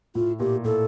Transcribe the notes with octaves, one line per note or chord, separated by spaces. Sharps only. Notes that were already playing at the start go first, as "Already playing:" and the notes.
A2 F4
A#2 G4
A2 A4